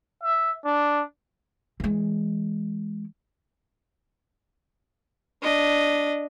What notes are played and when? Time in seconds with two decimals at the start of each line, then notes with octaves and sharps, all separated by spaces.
0.23 E5
0.65 D4
1.80 E3 G#3
5.42 D4 D#5